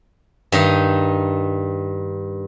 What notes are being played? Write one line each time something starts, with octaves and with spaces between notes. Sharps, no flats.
G2 D#3 D#4